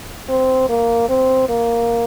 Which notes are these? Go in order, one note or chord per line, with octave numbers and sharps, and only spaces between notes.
C4
A#3
C4
A#3